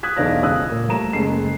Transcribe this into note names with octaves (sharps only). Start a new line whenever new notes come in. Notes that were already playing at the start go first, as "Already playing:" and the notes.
D#6 F#6 G#6 B6
B1 E2 A4 D5 F5 A#6
C#2 C#3 D#6 E6 F#6
A#2
G3 A3 A#5 E7
F#1 G#3 A4 C7